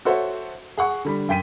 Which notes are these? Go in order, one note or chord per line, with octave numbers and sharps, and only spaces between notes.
F#4 A4 C5 C#5 E5 F#5
G#4 F#5 C#6
D3 G3 B5
F#2 G5 B6 D#7